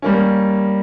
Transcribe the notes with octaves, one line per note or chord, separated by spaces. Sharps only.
G3 A#3 C#4